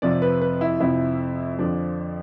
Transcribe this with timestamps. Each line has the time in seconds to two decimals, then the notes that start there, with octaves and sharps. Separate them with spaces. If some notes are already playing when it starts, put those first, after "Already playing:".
0.02 F2 C3 F3 D5
0.22 B4
0.41 B4
0.61 E4
0.80 F2 C3 F3 E4
1.59 F2 D3 F3 D4